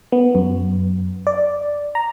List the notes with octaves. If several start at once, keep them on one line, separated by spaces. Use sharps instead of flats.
B3
F#2
D5
A#5